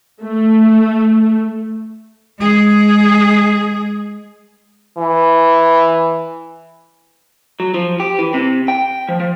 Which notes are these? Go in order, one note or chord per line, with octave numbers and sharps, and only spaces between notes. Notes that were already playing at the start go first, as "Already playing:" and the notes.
A3
G#3 G#4
E3
F#3
F3
G4
E3
C3
G5
F3
F3